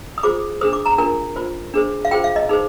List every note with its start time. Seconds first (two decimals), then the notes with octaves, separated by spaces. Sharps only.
0.18 D#6
0.23 F4 G#4 C5 D6
0.61 D4 G#4 C5 D#6
0.73 D6
0.86 A#5
0.98 D4 F4 A#4 G#5
1.36 F4 C5
1.74 D4 G#4 C5
2.05 F5
2.11 F4 G#4 C5 G5
2.24 F5
2.36 D#5
2.49 D#4 G#4 C5